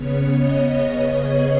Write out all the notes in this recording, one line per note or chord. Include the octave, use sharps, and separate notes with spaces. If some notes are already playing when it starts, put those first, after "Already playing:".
Already playing: C#3 B3 C#5
D#5
C#5
G#4